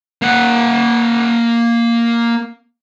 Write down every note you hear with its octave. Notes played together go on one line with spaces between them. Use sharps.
A#3 F#5